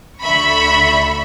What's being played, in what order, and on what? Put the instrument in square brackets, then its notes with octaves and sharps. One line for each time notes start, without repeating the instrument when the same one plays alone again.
[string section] D2 D3 E5 B5 C#6